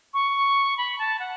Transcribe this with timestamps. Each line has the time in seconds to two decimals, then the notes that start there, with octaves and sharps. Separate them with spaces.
0.14 C#6
0.78 B5
0.99 A5
1.20 F#5